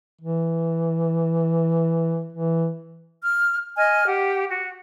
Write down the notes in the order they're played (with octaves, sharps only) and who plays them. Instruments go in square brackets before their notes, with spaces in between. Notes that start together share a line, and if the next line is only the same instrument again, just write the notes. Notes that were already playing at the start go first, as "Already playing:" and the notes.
[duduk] E3
E3
[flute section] F6
D#5 G#5 F6
G4 F#5
F#4